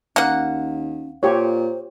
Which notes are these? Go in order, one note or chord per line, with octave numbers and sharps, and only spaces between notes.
D#2 A#3 C#4 F#5
A#2 F4 G4 C5 C#5